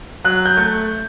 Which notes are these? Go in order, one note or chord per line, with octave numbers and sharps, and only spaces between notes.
F#3 F#6
G6
A3